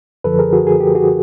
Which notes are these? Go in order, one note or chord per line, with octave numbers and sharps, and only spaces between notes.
F#2 D3 F3 A4 B4
G#4 A#4
F#4 G#4
G#4
G4
F#4 G#4